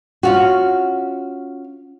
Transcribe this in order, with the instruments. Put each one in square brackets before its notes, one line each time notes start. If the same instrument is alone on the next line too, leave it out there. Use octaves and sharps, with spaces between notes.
[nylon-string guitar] C#4 F4 F#4